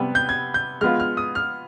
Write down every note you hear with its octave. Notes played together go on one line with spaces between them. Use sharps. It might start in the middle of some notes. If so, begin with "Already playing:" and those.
Already playing: C3 G3 B3
G6
G#6
G6
G#3 B3 F4 F6
F6
D#6
F6